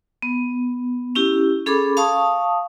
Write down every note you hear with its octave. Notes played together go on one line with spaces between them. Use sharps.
B3
C#4 E4 G4
C#4 G#4 A4 B5 D6
F5 A5 C#6 D#6